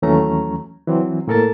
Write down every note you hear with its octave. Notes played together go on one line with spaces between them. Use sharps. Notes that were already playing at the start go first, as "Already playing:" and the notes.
D#2 E3 F#3 A3 C#4 A#5
E3 F#3 C4
A2 A#3 A4 A#4 A5 A6